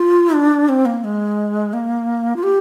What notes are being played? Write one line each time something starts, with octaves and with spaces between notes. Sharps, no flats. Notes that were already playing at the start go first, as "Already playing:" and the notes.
Already playing: F4
D4
C4
A#3
G#3
A#3
F4
G4